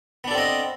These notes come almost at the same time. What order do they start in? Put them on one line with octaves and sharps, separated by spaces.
B3 D4 A4 C4 D#5